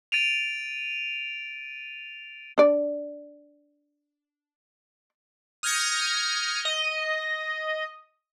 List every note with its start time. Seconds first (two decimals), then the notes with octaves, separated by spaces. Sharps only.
0.12 A6 D7 D#7 F7
2.58 D4 D5
5.63 D#6 F6 G6 G#6 A#6 C#7
6.65 D#5